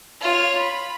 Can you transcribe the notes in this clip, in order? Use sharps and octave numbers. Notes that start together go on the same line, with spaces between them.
F4 C#5
B5